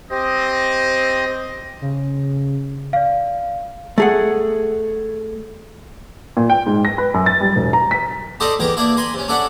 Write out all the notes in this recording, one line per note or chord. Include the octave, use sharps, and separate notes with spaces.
C4 G4 C5 D#5
C#3
D5 F5
A3 G#4 F#5
A#2
G5
G#2
A#6
B4
F#2
A6
G3
E1
A#5
B6
D#4 G4 A4 C5 D5 D#5
E2 E3 G4 A#4 D6
A#3 D4 E4 D5 E5
A#4 G#5 B5 C6
C3 C#4
C#4 D4 A4 D5 E5 F#5